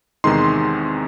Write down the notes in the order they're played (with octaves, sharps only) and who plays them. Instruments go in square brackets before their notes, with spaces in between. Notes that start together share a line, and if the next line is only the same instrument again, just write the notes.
[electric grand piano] E2 C3 D#3 G#3 D#4 C6